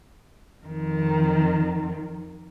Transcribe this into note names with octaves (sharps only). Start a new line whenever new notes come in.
F2 D#3